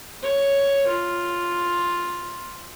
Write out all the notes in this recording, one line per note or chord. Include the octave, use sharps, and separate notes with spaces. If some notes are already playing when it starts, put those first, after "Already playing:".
C#5
F4